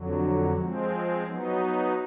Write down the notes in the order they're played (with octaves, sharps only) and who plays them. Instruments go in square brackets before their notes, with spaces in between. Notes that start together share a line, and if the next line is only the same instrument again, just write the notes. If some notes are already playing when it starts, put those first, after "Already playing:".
Already playing: [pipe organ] F2 D3 F#3
F3 G#3 C4
F#3 B3 D#4